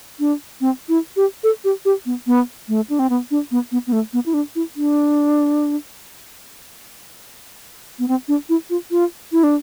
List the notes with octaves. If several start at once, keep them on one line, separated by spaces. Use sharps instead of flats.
D4
C4
E4
G4
A4
G4
G4
B3
B3
A3
D4
C4
B3
D4
B3
B3
B3
A3
B3
E4
D4
E4
D4
B3
C4
D4
E4
F4
F4
E4
D4